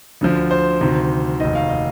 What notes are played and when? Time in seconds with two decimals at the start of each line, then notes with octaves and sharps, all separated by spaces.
0.21 D2 D3 F3
0.51 C5
0.81 D2 C3 D#3
1.40 F1 D#2 D#3 D#5
1.55 F5
1.69 D#5